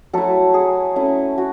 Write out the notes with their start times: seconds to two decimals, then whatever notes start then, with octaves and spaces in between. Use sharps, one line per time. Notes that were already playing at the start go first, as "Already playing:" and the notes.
0.13 F#3 A3 E4 A4
0.54 G#4
0.96 A3 C#4 E4
1.38 F#4